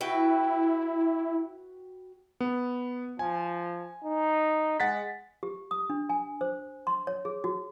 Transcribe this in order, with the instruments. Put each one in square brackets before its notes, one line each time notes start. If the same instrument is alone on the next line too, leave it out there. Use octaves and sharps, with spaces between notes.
[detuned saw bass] E4 [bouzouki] F#4 B4 G5
[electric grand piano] B3
[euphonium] F3 [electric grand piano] G#5
[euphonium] D#4
[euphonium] G#3 [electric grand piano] F#5 A6 B6
[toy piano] G4
D#6
D4
G#5
C5
C6
C#5
G#4
F#4